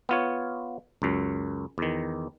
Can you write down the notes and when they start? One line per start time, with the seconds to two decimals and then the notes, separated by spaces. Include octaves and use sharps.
0.09 B3 F4 C#5
1.02 C#2 F#2
1.78 E2 D#3